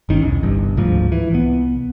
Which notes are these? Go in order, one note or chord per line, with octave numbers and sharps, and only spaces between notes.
G1 D#3 C4 C#4
B1 E2
G1 C2 G2
D1 D2 G#2 F3
E3
C2 B3